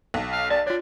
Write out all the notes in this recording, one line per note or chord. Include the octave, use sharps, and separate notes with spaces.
B1
F5
D5 A5
D4 F4 C#5